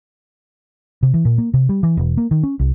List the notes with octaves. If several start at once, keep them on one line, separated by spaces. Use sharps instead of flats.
C3
E3
A#2
A#3
C3
G3
E3
E1
A#3
D#3
C#4
C2